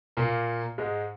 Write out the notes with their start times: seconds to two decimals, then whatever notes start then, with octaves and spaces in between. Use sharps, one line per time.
0.17 A#2 A#3
0.78 G#2 G#3